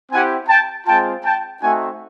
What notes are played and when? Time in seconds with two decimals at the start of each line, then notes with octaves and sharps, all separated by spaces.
0.10 C4 E4 G4 F#5 G#5
0.48 G5 A5
0.86 G#3 C4 F4 G5 A5
1.23 G5 A5
1.61 A3 C4 D#4 F#4 F#5 G#5